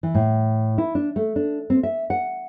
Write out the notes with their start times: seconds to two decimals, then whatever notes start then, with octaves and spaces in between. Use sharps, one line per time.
0.03 E3
0.15 A2
0.78 E4
0.95 D4
1.16 A3
1.36 D4
1.70 C4
1.83 E5
2.10 F#5